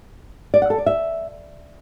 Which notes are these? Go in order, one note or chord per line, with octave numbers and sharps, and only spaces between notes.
D5
F#5
A4
D5
E5